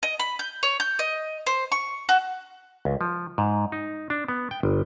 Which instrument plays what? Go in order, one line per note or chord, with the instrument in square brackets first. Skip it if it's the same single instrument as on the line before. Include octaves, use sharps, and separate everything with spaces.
[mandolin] D#5
B5
G6
C#5
G6
D#5
C5
C#6
F#4
[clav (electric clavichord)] C#2
F3
G#2
D#4
D4
B3
G5
G1